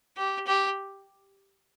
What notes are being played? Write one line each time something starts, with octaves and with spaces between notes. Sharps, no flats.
G4
G4